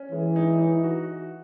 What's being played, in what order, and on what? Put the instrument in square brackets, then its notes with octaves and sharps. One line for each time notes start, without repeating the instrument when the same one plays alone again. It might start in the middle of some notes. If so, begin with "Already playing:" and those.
Already playing: [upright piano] C#4
[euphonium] E3 [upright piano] G#3
[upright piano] D#4
D#4
F#4